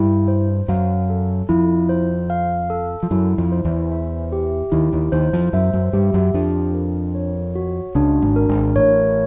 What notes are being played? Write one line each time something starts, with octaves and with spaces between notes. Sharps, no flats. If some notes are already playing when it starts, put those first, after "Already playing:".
Already playing: G2 G3 E4
C5
F#2 F#3 F5
A4
F2 F3 E4
C5
F5
A4
F3
F#2 F#3 E4
F2 F3
C5
E2 E3
E5
G4
D#2 D#3 E4
D#2 D#3
D#2 D#3 C5
F2 F3
F#2 F#3 E5
F#2 F#3
G2 G3 G4
F#2 F#3
F2 F3 D4
A#4
C#5
F#4
C#2 C#3 D4
G#1 G#2
A#4
G#1 G#2
A1 A2 C#5